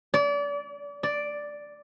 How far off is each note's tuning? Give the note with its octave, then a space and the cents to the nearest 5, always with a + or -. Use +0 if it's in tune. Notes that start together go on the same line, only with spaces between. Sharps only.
D5 -35
D5 +0